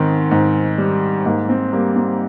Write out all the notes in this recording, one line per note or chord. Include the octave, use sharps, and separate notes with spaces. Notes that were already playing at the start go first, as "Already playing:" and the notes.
Already playing: G#2 D#3 C4
G#2
G3
G#2 A#3
C4
G3 A#3
C4